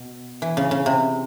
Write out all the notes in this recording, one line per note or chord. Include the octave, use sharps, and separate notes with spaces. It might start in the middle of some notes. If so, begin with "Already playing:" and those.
Already playing: B2
E3
C#3
C#3
C3